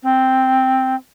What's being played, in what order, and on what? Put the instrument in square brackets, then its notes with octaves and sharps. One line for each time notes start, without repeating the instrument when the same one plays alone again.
[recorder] C4